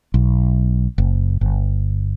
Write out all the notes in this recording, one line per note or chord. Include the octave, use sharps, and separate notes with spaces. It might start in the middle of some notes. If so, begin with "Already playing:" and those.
B1
F#1
G1